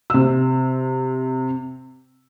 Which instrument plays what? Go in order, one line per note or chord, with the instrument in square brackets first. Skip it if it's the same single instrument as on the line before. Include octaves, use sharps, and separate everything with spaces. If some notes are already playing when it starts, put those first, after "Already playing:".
[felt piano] C3 E6